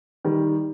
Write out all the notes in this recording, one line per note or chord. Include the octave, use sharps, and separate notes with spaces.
D#3 G3